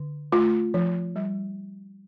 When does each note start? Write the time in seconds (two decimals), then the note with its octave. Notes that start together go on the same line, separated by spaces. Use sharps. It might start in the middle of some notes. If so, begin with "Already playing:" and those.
Already playing: D3
0.32 A3 F4
0.74 F3
1.16 G3